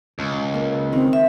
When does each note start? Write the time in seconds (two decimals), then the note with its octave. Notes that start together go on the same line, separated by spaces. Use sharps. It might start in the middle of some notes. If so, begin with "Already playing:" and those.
0.19 C#2
0.54 A#3
0.93 D#3 C4
1.13 E5